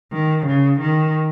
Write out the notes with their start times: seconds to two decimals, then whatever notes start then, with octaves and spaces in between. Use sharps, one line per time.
0.12 D#3
0.46 C#3
0.81 D#3